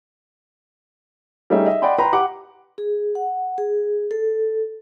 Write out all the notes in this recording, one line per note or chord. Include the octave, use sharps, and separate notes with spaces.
G3 A3 C#4 D#4 G#4 E5
D#5 E5
D5 D#5 F#5 G5 B5 C6
B4 G5 A#5 C6
G4 F#5 D6
G#4
F#5
G#4
A4